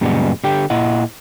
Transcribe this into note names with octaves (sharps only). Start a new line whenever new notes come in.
F#2 A#2 C#3 G3 G#3 B3
D3 G4 G5
A#2 E4 D#5 F#5